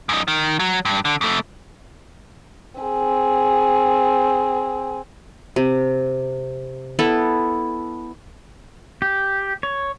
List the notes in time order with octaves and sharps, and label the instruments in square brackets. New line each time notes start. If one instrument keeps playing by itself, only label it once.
[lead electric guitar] F#2 D#4
D#3
F#3
G2
D3
F2 A3
[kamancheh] C4 G#4
[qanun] C3
B3 E4 A4
[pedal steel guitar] G4
C#5